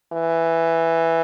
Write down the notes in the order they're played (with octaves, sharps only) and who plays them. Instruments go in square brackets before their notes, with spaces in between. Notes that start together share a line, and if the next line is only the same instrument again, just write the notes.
[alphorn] E3